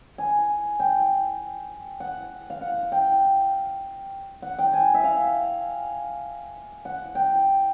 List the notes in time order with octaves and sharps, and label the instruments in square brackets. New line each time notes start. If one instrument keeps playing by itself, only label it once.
[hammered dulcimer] G#5
G5
F#5
F5
F#5
G5
F#5
G5
G#5
E5
F5
F#5
G5